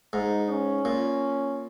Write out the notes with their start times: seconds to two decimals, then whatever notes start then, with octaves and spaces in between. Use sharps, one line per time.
0.13 G#2 D#4
0.50 C#4
0.85 A#2